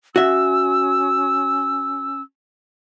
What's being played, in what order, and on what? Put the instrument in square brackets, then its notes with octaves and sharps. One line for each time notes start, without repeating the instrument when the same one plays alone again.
[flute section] C#4 E6 [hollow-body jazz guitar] F#4 E5